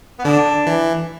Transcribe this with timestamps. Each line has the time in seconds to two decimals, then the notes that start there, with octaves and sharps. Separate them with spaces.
0.19 B3
0.24 D3 D4
0.67 E3